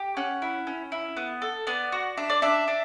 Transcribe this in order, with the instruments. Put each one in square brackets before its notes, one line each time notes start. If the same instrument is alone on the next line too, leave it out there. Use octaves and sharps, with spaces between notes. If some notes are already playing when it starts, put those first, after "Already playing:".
Already playing: [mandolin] G4
C#4 F#5
E4
C#4
E4
B3
A4
B3 D5
F#4
D4 E5
D5
D4 E5
D4